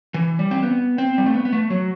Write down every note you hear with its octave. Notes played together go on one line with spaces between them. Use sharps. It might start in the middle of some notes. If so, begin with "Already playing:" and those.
E3
G3
C4
B3
C4
G3
A3
B3
B3
A3
F#3